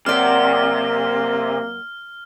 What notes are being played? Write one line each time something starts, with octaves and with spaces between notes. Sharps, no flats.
F#2 C3 A#3 D5 F#5 F6